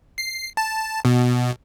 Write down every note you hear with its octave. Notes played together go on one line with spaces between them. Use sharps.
C7
A5
B2